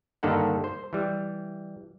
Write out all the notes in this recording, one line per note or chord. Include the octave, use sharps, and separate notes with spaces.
G2 D3 D#3 A#3 A4 F#5
C5
E3 G3